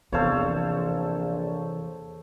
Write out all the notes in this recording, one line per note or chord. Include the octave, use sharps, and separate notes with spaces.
A#1 E2 C3 E3 A4 C5 C#5 F5